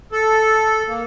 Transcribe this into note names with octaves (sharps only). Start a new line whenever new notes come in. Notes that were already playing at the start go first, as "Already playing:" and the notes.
A4
A#3